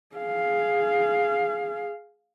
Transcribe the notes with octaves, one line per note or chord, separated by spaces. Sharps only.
G#4 F5